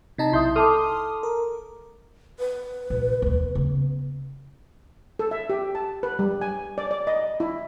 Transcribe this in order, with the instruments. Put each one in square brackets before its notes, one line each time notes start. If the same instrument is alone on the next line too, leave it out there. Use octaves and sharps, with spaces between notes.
[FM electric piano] C3 D#4 A5
[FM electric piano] B1 C6 G6 [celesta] E4 E5 D#6
[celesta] A4 A5 D6 [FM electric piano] C6 D#6 F6
[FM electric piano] A#4
[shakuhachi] B4
[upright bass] A#1
D#2 B2
C#3 B3
[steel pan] A4
E5
G4
A5
B4
G3
G#5
D5
D5
D#5
E4